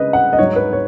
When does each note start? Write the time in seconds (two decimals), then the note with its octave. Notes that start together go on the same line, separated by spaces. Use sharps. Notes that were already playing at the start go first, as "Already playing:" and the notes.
Already playing: C#3 G#3 B4 D#5
0.13 F#5
0.33 D#5
0.38 G#2 F#3 D#4 C#5
0.56 B4
0.73 C#5